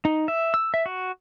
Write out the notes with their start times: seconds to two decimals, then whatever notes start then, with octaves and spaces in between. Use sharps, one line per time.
0.05 D#4
0.28 E5
0.54 E6
0.74 E5
0.86 F#4